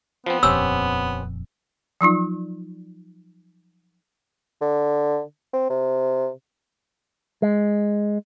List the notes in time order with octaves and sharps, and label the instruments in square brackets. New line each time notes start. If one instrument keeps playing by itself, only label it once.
[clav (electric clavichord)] F3 C4 [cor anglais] B3
[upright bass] D#1 F2 [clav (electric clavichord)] C4 C#4 G4 [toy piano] E6
[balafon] F3 F#3 D#4 F4
[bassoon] D3
C4
C3
[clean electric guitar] G#3